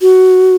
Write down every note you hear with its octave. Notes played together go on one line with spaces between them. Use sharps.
F#4